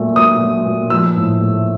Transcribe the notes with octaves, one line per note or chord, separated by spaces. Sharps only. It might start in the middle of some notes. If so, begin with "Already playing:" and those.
Already playing: A#2 F#3 A3
A#2 D#6
F#3
A#2
F3 E6
A2
A3